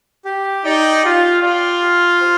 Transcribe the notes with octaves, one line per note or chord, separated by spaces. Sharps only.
G4
D#4 D5 G5
F4 G4
F4 D5 G5
G4
C5